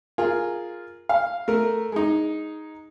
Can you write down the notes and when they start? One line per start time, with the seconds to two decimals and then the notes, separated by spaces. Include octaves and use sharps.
0.18 F4 G#4 A#4
1.09 F5
1.48 A3 A#4
1.92 G#3 D#4